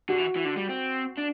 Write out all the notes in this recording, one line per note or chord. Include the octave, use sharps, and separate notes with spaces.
D3 F#4
E3
E3
D3
G3
C4
D4